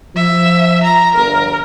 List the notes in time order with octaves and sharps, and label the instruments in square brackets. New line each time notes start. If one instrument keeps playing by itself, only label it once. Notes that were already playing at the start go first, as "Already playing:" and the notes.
[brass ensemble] F3 [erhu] E5
[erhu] A#5
[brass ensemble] G1 [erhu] A#4